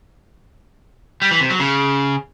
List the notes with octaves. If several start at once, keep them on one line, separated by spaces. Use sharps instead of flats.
G3
E3
C3
F#3
C#3